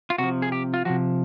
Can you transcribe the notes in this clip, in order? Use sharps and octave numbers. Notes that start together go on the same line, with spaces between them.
F4
C3 F3 F#4
G#4
G4
F4
C3 F3 F#4